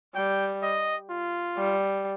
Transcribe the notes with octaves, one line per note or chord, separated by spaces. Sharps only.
G3 G5
D#5
F4
G3